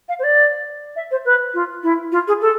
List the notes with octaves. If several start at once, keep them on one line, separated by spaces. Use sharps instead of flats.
F5
C5
D5
E5
C5
B4
F4
E4
F4
G#4
A4